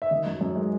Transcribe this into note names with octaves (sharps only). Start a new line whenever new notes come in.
E5
G#1 D#5
F#2
F#2
G#3